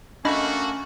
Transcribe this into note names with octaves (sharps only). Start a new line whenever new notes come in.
A3 A#3 C#4 D4 F#4 D#5 B5